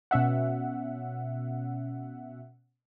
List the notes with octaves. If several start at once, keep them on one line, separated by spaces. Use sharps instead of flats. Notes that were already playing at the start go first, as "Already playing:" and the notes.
B2 C#4 E5 F#5